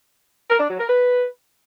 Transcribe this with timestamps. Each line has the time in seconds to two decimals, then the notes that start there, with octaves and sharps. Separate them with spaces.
0.49 A#4
0.59 D4
0.69 F#3
0.79 A#4
0.89 B4